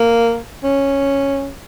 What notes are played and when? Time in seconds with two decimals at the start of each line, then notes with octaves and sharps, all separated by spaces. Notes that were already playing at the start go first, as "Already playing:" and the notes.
Already playing: A#3
0.63 C#4